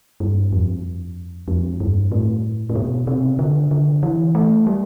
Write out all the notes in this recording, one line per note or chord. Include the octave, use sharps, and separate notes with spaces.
G2
F2
F2
G2
A2
A2
B2
C3
D3
D3
E3
A3
G3